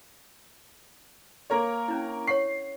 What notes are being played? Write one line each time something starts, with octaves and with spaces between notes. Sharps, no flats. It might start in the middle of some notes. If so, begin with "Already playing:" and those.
A#3 A#4 C#5
C#4 D4 E4
C#5 F#5 C#6 C7